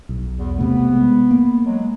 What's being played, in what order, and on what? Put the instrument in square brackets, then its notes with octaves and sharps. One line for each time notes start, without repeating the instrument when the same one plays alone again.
[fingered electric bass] B1
[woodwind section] E2
[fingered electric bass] C3 A3 [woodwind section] B3
[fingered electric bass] G#3
A#3
[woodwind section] F#3 G#3